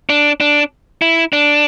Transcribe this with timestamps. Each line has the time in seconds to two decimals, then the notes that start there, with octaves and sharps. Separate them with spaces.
0.09 D4
0.40 D4
1.02 E4
1.33 D4